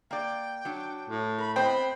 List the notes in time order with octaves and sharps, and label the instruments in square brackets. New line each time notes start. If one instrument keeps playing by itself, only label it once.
[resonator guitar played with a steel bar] A#3 D5 [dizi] G5
[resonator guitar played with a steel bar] F#3 D4
[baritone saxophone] A2
[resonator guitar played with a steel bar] A#4 [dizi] B5
[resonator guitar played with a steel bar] B3 C4 D#5 [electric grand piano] C5 G5 [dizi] B5